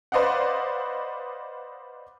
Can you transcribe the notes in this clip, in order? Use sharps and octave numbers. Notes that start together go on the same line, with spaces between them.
B4 C5 D5 D#5 F5 F#5